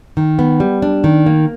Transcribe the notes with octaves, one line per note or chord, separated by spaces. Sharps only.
D#3
B3
G3
D4
D#3
A#3